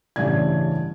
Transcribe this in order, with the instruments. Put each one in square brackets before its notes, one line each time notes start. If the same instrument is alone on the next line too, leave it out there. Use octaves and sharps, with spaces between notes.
[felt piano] A1 G2 C#3 A3 D5 G#6